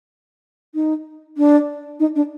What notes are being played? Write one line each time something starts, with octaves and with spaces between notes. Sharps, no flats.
D#4
D4
D#4
D4